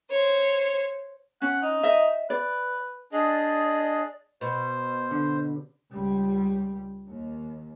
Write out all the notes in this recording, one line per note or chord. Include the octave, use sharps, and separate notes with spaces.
C5 C#5
C#4 F#5
D#4
D#5 E5
B4 D5
D4 G#4 D5 D#5
B2 C5
D3
C#2 G3
D#2